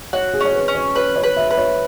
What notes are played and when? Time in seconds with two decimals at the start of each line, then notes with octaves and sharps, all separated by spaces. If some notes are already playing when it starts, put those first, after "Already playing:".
0.13 F#4 C#5
0.34 G#4
0.41 C#4 C#5
0.55 B4
0.68 C#4
0.75 C#5
0.95 B4 C#5
1.16 C#5
1.23 B4
1.36 E5
1.51 B4
1.58 C#5